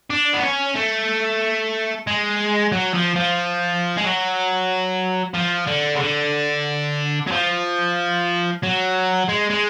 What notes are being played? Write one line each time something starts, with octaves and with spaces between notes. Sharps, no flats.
D4
B3
C#4
A3
G#3
F#3
F3
F3
G#3
F#3
F3
D3
C#3
D3
F#3
F3
F#3
G#3
G#3